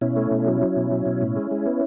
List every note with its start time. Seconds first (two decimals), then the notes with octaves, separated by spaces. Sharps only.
0.01 B2 C#4 E4
0.16 A3
0.31 B2
0.47 F#3
0.61 F#3
0.76 B2
0.91 F#3
1.06 B2
1.22 A2
1.36 G#3
1.51 G#3
1.66 B3